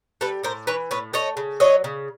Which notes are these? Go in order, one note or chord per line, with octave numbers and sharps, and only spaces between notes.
G3 A4 B4
A2 A#4 C5
E3 B4 C#5
A2 B4 C#5
A3 C#5 D#5
C#3
F#3 C#5 D#5
C#3